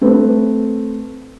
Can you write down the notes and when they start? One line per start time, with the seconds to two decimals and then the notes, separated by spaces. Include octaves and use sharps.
0.01 A3 C4 B4